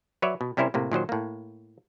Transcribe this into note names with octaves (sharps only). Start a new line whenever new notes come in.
F#3 B4 C#5 D5 E5
B2
C3 G3 C#4 E4 A#4 C5
A2 C3 A#3
A#2 D#3 F#3 C5
A2 A#3